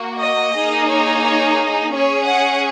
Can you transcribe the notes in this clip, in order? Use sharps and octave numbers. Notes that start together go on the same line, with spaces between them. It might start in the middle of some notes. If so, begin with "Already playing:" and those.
Already playing: A#3 F#4
D#5
A#3 D#4 G#4
C#5
C#5
C#4 G#4 C#5
F#5